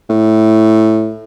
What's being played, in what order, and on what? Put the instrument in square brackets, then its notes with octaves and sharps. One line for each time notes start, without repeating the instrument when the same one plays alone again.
[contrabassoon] A2